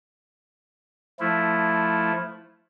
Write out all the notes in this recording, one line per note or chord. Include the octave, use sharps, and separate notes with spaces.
F3 A3 E4